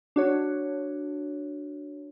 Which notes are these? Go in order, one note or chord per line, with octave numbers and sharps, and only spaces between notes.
D4 F#4 C#5